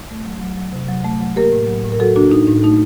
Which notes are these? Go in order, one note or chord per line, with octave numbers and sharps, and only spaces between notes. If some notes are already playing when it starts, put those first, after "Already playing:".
A3
F#3
F#3
F#3
C3
F#3
A3
F#3
A#3 G4 A#4
A2
F#3
A2
A#4
F#3 F#4 A4
A#3 D4 F#4
A2 D#4
A2 D#4
A3 D#4